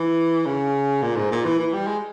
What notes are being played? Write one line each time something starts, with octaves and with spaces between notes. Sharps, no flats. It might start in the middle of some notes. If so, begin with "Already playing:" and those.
Already playing: E3
C#3
A#2
G#2
A#2
E3
E3
G3
G#3